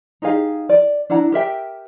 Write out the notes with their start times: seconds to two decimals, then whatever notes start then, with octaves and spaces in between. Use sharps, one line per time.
0.22 D#4 G4 G#4 F5
0.69 D5
1.10 D4 E4 F#5 A#5
1.32 G4 A#4 E5 G5